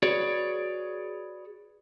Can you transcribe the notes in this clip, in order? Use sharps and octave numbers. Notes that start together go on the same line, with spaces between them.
F#4 G#4 B4 C#5 D5